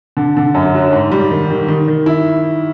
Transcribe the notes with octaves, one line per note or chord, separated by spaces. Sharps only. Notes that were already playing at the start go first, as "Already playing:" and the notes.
D3
D3
F#2
F#3
G#2
G3
D#3
D#3
D#3
D#3
E4